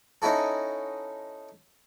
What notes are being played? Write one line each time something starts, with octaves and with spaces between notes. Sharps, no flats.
C#4 D#4 E4 F#4 A4